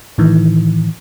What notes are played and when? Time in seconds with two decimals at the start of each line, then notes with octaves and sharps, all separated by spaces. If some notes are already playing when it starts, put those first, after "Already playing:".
0.18 A2 D#3 E3